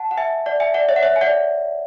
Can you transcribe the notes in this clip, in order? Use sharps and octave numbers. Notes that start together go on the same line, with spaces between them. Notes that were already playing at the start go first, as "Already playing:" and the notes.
Already playing: F#5 A5
F#5
E5 G#5
D5 F#5
E5 G#5
D5 F#5
C#5 E5
F#5
C#5 E5
G#5
D5 F#5